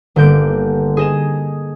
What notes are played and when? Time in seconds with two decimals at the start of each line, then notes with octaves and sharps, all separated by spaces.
0.16 G1 D3 A#3 G6 D7
0.97 G#4 D#5 E7